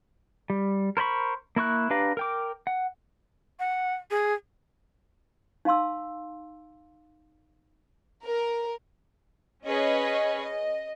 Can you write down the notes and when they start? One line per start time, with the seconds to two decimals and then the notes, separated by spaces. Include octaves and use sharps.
0.50 G3
0.97 A#4 C5 C#5 B5 C#6
1.56 A#3 E4 C#6 F#6
1.90 D4 G4 B4 F5 A#5
2.17 A#4 G5 D6
2.67 F#5
3.59 F#5
4.11 G#4
5.65 D#4 F5 A5 C6 E6
8.25 A#4
9.66 C#4 G#4 B4 C#5 D#5
10.41 D#5